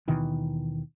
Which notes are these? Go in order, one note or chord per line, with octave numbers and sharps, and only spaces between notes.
D#2 B2 D#3 E3